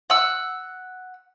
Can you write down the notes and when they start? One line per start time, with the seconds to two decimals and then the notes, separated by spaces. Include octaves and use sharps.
0.10 F#5 E6